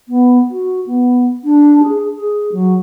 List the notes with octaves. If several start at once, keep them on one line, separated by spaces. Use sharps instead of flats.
B3
F#4
B3
D4
G#4
G#4
F#3